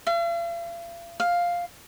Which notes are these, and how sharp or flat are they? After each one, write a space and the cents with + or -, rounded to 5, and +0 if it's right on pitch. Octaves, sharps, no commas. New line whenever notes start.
F5 -45
F5 +5